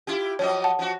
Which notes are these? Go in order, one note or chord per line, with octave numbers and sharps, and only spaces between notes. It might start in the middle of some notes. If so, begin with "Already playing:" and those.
E4 F4 G4
F3 F#3 C#5 D#5
F#5 A5
F3 F#4